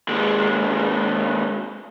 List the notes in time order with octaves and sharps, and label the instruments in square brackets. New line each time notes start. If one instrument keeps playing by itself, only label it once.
[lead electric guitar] D#2 G#3